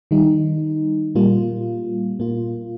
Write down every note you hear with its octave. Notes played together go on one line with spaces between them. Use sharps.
D#3 G3 D#4
A#2 G3 A#3 F4
A#2 A#3 F4